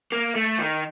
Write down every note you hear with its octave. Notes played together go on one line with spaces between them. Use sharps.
A#3
A3
D#3